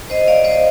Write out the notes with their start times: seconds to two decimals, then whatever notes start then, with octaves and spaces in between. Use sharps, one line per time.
0.10 C5 D#5
0.27 D5 F5
0.44 C5 D#5